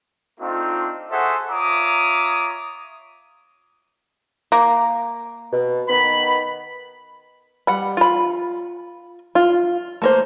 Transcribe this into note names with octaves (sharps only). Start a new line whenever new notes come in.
A3 C4 D4 D#4 F4
F#4 G#4 A4 C5 E5 F#5
F4 C#5 E5 A#5 D6 D#6
A#3
B2
D#3 B3 B5
G3 F#5 B5
F4 B5
F4
A3 A#3 C5